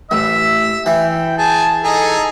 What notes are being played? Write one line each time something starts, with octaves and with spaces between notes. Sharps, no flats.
A1 E5 E6
E3 G5
G#4 A5
D#4 G#4 A4 A#5